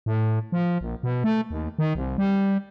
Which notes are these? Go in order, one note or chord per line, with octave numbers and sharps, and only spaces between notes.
A2
F3
A#1
B2
A3
D#2
D#3
C2
G3